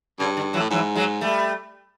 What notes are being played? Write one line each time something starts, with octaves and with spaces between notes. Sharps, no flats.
G2 C#3
D3
E3 F#3
A2
G#2 E3 F#3
F#3 G#3
G3 A3